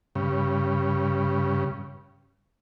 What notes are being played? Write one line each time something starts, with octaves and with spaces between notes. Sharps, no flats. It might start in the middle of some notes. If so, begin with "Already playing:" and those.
G2 C#3